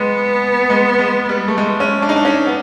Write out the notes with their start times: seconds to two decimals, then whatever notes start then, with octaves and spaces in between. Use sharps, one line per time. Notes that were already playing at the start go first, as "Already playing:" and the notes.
Already playing: G#3 B3
0.70 G#3
0.99 G#3
1.29 G3
1.48 A3
1.58 G#3
1.80 C#4
2.02 D4
2.09 D#4
2.16 D4
2.25 C#4
2.47 B3